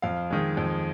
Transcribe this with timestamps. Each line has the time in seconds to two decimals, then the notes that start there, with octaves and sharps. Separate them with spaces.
0.02 F2 F5
0.30 D#3 G#3
0.57 F2